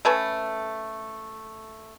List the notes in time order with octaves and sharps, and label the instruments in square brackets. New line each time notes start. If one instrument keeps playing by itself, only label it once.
[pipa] A3 C#4 A4 B4